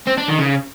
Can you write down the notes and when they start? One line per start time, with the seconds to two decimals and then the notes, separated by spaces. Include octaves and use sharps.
0.07 C4
0.18 D4
0.28 D#3
0.39 C#3